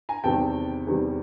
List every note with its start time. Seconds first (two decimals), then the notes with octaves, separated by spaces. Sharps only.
0.09 G#5 A#5
0.24 E2 C3 D#3 G3 G5 A5
0.87 E2 C3 D#3 G3